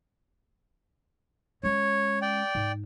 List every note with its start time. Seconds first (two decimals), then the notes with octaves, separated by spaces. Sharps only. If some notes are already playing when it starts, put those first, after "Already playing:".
1.63 G#3 C#4 C#5
2.22 D5 G5
2.55 G#2